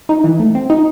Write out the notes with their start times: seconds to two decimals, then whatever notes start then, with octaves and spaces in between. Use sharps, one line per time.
0.09 D#4
0.24 E3
0.40 A3
0.55 C4
0.70 D#4